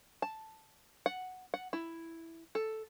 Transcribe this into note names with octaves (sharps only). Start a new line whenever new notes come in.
A5
F#5
F#5
E4
A4